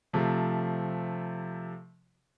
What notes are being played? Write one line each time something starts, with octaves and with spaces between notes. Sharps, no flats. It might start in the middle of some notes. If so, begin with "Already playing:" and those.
C3 F3 A3